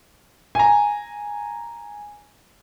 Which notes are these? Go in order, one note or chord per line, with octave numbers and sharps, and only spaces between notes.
G#5 A#5